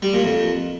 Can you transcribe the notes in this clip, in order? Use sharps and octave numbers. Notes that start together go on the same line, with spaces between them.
G3
A#2
F2